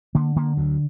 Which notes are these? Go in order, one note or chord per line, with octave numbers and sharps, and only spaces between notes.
D3 A#3
D3 A#3
D2 F#3